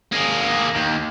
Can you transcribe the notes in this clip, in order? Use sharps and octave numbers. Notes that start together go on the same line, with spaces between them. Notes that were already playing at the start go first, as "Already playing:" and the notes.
A#3 G#4
D#2